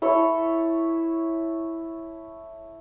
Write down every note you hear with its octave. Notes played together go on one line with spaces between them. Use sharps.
E4 A4 C#5